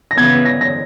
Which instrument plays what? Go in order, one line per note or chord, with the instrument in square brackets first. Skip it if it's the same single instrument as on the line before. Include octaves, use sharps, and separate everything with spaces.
[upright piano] A#6
[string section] C#3 E3 B3 [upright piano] G#6
[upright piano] A#6
A#6